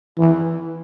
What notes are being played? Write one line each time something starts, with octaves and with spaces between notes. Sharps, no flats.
E3